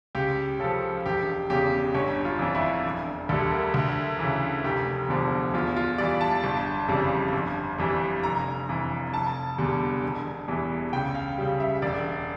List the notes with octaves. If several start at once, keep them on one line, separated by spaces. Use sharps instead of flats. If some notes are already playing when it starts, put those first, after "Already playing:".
C#2 G4
C#3 F3 A4
E1 G4
E2 C#3 G4
G1 C#5
F4
F2 E3
E4
E1
D2 D3 G3 A4
A#4
D2
C#3 E3
F1 G4
E2 D3 F3
E2 F4
F4
E3 G3 D5
A5
G1
F2 C#3 E3 G3
G1
F2 E3 G3
F1 A#5
F2 E3
F1 A5
E2 D3 G3
E1
E2 E3 G3
C#2 G5
F5
C#3 G3
E5
E1 D5